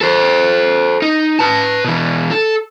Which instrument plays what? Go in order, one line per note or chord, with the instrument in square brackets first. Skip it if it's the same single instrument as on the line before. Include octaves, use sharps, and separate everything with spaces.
[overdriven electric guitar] A4 C5
D#4
B4 A5
B2 E3
A4